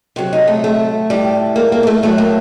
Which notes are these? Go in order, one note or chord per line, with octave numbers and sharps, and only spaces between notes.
C3 F#3 F#4
D#4
A3
A3
A2 G3
A#3
A#3
A#3
A3
A2 F#3 A3
A#3